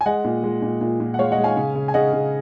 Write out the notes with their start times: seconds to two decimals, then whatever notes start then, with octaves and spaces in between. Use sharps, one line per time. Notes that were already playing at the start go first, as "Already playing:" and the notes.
0.01 G#5
0.06 G#3 D#5 F#5
0.25 A#2
0.44 G#3
0.62 A#2
0.81 A#2
1.00 A#2
1.14 F#5
1.19 G#3 C#5 F5
1.32 D#5 F#5
1.38 G#3
1.44 F5 G#5
1.56 C#3
1.75 C#3
1.88 G#5
1.94 C#3 D#5 F#5
2.13 C#3